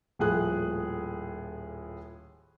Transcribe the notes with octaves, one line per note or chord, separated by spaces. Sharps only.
D#1 A2 F3 G#4 F#6